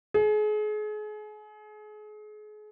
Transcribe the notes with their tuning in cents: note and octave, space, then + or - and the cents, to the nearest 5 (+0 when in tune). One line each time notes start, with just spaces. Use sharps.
G#4 +35